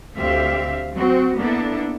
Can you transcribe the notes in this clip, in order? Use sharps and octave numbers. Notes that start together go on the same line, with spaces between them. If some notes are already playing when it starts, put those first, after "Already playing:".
D2 C4 G4 E5 F5
F#3 C4 F#4
A#3 B3 D4 E4 A4